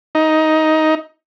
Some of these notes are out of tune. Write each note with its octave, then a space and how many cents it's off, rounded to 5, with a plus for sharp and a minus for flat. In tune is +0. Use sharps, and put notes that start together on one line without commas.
D#4 +15